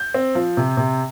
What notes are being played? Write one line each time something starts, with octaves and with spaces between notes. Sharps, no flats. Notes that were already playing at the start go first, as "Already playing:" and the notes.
Already playing: G6
C4
F3
C3
C3